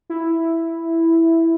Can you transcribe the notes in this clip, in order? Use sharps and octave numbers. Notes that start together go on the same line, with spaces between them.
E4